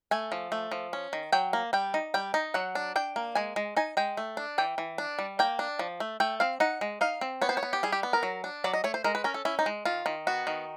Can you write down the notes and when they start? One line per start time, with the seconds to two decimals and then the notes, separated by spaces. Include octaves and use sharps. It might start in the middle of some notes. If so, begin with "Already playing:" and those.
0.11 A3 G#5
0.32 F3
0.52 A3
0.71 F3
0.93 C#4
1.13 D#3
1.32 F#3 G5
1.53 A#3
1.73 G3 G5
1.94 D#4
2.14 G3 G5
2.34 D#4
2.54 F#3 F#5
2.75 D4
2.96 D4 G5
3.16 A#3
3.35 G#3 G#5
3.56 G#3
3.76 D#4 G#5
3.97 G#3 G5
4.17 A3
4.37 D4
4.58 E3 G5
4.78 E3
4.98 D4
5.19 G3
5.39 A#3 G5
5.59 D4
5.79 F3
6.00 A3
6.20 A3 G5
6.40 C4 F5
6.60 D#4 F#5
6.81 G#3
7.01 D#4 F5
7.21 C4
7.42 B3 C#5
7.49 C5
7.57 C#5
7.63 B3
7.73 G4
7.83 G3 G#4
7.92 G4
8.03 B3
8.13 A#4
8.23 F#3
8.44 D4
8.64 F#3 D5
8.73 D#5
8.84 A3 C#5
8.94 C5
9.04 G#3 A#4
9.15 B4
9.24 C#4 A#4
9.34 A4
9.45 C#4 E4
9.59 D#4
9.66 G#3
9.85 D#3 F4
10.06 D#3
10.27 B3 F#4
10.47 D#3